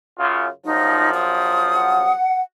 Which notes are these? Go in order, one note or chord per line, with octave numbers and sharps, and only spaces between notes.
F#2 C#3 F4
A#1 F#2 F3 D#4
D#6
F#5